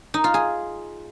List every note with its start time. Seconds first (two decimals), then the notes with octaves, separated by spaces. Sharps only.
0.14 D#4
0.24 F4
0.34 G#4